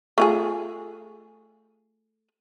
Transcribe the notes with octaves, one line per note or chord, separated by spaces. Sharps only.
A3 F4 G#4